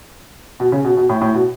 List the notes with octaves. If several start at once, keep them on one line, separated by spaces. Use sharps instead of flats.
B2
C#3
B2
B2
A2
A2
B2